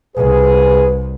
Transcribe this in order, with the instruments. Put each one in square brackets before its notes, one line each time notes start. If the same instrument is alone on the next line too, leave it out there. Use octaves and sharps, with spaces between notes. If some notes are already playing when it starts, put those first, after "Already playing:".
[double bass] C2 [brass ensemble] G#4 [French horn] B4